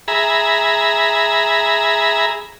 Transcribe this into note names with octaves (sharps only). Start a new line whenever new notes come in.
G#4 E5 A#5 B5